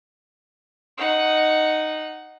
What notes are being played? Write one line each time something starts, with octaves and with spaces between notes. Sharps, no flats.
D#4 F#5